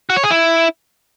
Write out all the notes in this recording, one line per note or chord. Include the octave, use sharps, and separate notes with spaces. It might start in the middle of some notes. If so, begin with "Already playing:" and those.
F#4
C#5
G#4
E4